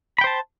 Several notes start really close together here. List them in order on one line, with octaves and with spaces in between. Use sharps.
B5 G5 C5 A5